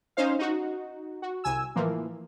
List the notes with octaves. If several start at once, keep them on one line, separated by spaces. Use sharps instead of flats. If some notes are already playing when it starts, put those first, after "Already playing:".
C#4 D#4 C5 F5
D#4 F#4
F#4
C2 G#5 E6
A2 E3 F3 A#3